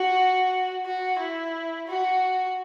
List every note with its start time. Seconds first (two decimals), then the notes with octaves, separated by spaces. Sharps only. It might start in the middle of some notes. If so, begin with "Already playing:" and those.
Already playing: F#4
0.85 F#4
1.19 E4
1.87 F#4